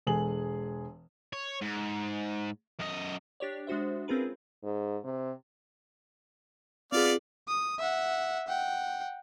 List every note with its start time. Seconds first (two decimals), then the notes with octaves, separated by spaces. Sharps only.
0.07 E1 G#3 G#4 A4 G#5 F#7
1.33 C#5
1.62 G#2
2.80 F#2 D#5
3.40 D4 G4 C#5 D5
3.67 G#3 D4 F#4 C5 E5
4.08 C4 C#4 F4 G#4 A#4 B4
4.64 G#2
5.04 C3
6.92 B3 C4 F4 G#4 D5 F5
7.48 D#6
7.79 E5 F#5
8.48 F#5 G5